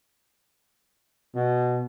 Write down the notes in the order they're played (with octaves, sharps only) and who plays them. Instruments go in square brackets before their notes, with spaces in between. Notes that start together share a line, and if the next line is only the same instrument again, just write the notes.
[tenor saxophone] B2